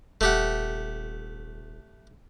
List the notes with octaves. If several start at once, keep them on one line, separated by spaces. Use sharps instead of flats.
D#1 A3 G4 F#5